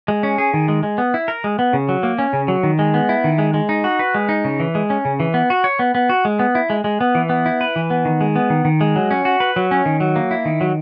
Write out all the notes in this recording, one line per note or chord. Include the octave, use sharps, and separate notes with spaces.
G#3
C#4
G#4
D#3
G#3
G#3
B3
E4
A#4
G#3
B3
C#3
F#3
A#3
C#4
C#3
F#3
D#3
G#3
B3
E4
D#3
G#3
G#3
D#4
F#4
B4
G#3
D#4
C#3
E3
G#3
C#4
C#3
E3
B3
F#4
C#5
B3
B3
F#4
G#3
B3
E4
G#3
G#3
B3
E3
B3
E4
B4
E3
B3
D#3
G#3
B3
D#3
D#3
G#3
F#3
C#4
F#4
B4
F#3
C#4
D#3
F#3
A#3
E4
D#3
F#3